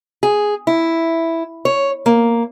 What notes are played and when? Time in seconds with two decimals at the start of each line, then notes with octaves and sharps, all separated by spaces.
0.23 G#4
0.67 E4
1.65 C#5
2.06 A#3